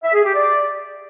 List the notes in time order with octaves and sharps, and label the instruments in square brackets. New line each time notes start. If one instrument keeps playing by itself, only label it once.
[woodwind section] E5
G#4
G4
D5